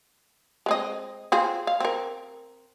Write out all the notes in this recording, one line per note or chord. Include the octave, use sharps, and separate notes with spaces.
G#3 C4 D#5
C4 F4 G#4
F5
C4 A#4